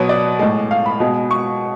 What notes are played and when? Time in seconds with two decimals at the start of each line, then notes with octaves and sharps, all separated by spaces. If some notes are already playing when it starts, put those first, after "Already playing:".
Already playing: B2 F#3 B4 C#5
0.09 D5
0.39 A2 G#3
0.71 F5
0.86 B5
1.00 B2 G#3
1.31 C#6